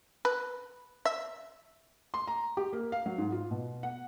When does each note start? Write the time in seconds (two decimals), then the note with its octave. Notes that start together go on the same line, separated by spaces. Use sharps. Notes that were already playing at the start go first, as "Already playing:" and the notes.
0.25 B4
1.05 E5
2.14 C6
2.27 A#5
2.57 G4
2.73 A#3
2.92 F5
3.06 F#3
3.18 G#2
3.32 F4
3.51 B2
3.83 F#5